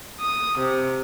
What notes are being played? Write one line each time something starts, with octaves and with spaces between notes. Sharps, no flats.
D#6
C3